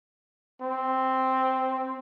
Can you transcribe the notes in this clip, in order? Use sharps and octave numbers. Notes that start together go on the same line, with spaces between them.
C4